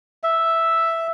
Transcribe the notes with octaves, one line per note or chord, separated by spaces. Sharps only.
E5